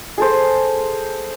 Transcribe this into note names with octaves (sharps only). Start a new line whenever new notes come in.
G#4 A4 C5